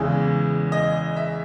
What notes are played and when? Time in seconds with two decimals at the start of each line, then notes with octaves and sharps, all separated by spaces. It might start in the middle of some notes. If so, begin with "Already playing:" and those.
Already playing: E2 C#3 E3 G#3
0.72 D#5
1.16 E5